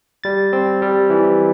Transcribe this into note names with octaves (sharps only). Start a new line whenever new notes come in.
G3 A6
C4
G3
E3